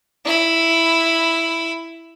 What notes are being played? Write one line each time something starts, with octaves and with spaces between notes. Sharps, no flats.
E4 B5